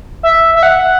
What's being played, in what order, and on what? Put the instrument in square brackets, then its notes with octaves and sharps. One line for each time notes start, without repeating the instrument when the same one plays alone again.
[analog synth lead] E5
E5
F#5